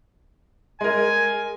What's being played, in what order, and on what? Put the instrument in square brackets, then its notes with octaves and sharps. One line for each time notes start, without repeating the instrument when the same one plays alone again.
[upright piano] G#3 A#4 [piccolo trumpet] G#5